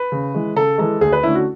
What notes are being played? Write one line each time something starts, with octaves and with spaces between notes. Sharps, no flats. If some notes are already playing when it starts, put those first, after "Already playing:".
Already playing: B4
C#3
E3 G#3
C#3 A4
E3 G#3 A4
D2 G#4
B4
D3 A3 C#4 E4
F#4